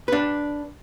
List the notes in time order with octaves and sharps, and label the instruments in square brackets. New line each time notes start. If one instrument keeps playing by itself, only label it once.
[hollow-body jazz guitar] D4 B4